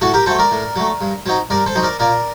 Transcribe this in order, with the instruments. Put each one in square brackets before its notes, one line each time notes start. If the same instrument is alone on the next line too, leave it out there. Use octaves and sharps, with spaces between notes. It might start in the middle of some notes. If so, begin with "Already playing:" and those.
[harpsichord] A2 F#4 A4
G4 A#4
F#3 A4 C5
A3
A#4 D5
A2
F#3 A3
G2
F#3 C4 D#4
G2 A#4 D5
A4 C5
F#3 C4 D#4
A#4 D5
A#2 A#4 D5